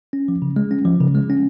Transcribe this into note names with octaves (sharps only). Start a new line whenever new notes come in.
C#4
F3
C#3
G#3
C#4
F3
C#3
G#3
C#4